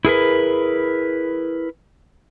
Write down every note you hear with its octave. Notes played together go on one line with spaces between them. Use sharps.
E4 G#4 A#4 B4